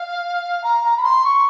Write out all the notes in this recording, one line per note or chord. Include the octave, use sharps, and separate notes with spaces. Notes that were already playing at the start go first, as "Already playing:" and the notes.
Already playing: F5
A#5
A#5
B5
C6
C#6